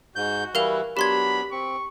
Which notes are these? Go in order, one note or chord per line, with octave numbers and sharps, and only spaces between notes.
G#2 F#4 G6
E3 G3 E4 A#4 F5 F7
F#3 B3 D4 G4 B5 C6 G#6
C4 C#6